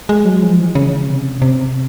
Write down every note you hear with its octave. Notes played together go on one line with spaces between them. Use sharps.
G#3
F#3
F3
E3
C#3
C3
C3